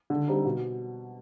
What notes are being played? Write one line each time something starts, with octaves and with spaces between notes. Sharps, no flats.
D3
G3 C4 D#4
B2